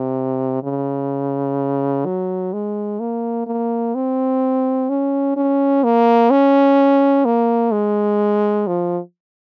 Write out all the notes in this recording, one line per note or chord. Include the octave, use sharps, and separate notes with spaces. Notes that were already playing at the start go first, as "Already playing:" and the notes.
Already playing: C3
C#3
F#3
G#3
A#3
A#3
C4
C#4
C#4
A#3
C#4
A#3
G#3
F3